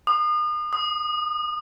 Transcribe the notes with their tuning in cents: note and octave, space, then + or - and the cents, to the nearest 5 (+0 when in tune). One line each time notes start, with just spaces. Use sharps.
D#6 -40
D#6 -5